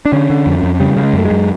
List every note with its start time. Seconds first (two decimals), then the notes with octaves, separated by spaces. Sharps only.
0.05 D4
0.12 D3 C#4
0.30 D3
0.46 F2
0.63 F2
0.80 C#3 G3
0.97 C#3
1.03 G#3
1.13 F#2 A3
1.25 G#3
1.31 F#2